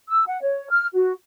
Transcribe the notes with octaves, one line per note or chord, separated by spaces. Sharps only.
E6
F#5
C#5
F6
F#4